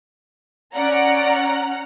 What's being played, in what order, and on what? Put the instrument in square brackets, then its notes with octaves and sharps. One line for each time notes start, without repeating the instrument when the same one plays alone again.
[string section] C#4 F#5 A#5 [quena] D5